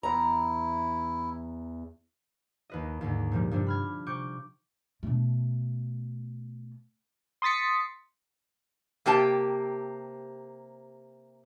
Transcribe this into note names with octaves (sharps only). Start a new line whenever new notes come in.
E2 E4 A#5
D#2 B4 D#5
D#2 G#2 D3
A#2 F3 G3
G2 C3 F3 G3 D4
B5 F6 G#6
C3 C#6 D6 G6
B2 A3
C6 D#6 A6 B6 C#7
C3 A#3 G4 A5